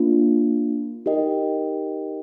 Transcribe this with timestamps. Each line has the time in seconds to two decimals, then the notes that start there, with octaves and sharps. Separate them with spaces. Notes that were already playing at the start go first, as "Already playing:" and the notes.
Already playing: A#3 D4 F4
1.06 D#4 G4 A#4 D#5 G5